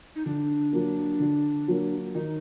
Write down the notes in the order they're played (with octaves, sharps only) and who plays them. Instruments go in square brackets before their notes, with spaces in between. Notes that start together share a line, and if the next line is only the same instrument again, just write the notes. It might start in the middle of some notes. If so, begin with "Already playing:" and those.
[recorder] D#4
[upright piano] D3 [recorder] D4
[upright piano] F#3 A#3
D3
F#3 A#3
[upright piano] D#3 [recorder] D#4